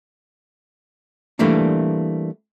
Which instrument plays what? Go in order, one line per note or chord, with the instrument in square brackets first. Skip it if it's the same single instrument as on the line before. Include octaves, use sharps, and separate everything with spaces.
[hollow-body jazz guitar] E3 G3 A3 A#3 D4